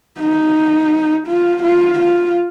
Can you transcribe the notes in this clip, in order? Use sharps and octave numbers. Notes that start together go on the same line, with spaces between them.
D#4
F4
F4
F4